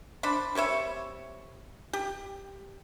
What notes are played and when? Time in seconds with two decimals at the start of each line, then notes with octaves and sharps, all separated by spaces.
0.23 D4 C5 D5 B5
0.55 G3 C4 C#5 E5
1.93 G4